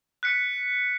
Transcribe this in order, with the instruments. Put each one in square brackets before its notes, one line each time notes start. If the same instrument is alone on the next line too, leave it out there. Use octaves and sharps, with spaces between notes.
[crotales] F#6 B6 C#7